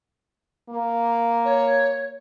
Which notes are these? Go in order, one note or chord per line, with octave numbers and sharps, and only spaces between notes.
A#3
C#5